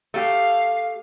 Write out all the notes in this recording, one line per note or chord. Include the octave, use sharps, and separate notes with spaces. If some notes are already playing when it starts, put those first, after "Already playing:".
A3 G4 F5